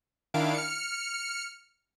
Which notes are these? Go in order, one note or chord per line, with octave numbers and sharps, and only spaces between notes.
D#3 D4 E4 F5 D7
F6 C#7